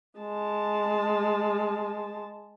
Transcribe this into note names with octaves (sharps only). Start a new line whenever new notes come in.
G#3 A5